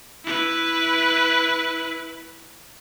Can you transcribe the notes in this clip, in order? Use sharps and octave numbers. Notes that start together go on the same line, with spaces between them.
E4 B4